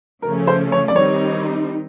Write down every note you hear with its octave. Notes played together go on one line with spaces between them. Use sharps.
C#3 F3 A3 C#4 A#4
C5
C#5
D5
D#3 G3 C4 D#4 C#5